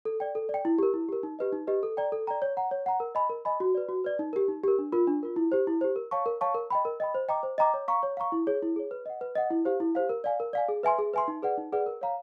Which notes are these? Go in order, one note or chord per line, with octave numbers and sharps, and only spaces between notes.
A4
D5 G5
A4
D5
G5
E4
G4 A#4
E4
G4 A#4
D#4
G4 B4 D#5
D#4
G4 B4 D#5
A4
D5 G5 A#5
A4
D5 G5 A#5
C#5
F#5 A#5
C#5
F#5 A#5
A#4
D#5 G#5 B5
A#4
D#5 G#5 B5
F#4
B4 D5
F#4
B4 D5
D#4
G4 A#4
D#4
G4 A#4
D4
F4 A#4
D4
F4 A#4
E4
G4 C5
E4
G4 C5
A#4
C#5 F5 A5 C#6
A#4
C#5 F5 A5 C#6
A#4
D#5 G5 B5
A#4
D#5 G5 B5
C5
D#5 G5 A#5 D6
C5
D#5 G5 A#5 D6
C#5
F5 A#5 C#6
C#5
F5 A#5 C#6
E4
G#4 C#5
E4
G#4 C#5
B4
D#5 F#5
B4
D#5 F#5
E4
G4 C5 F5
E4
G4 C5 F5
A#4
D5 F5 G#5
A#4
D5 F5 G#5
G#4
B4 E5 G#5 C6
G#4
B4 E5 G#5 C6
D#4
G#4 B4 D5 F#5
D#4
G#4 B4 D5 F#5
A#4
C#5 F5 A#5